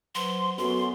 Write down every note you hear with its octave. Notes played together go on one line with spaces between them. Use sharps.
F#3 B4 C5 C6
F#2 B3 F#4 A4 B4 C6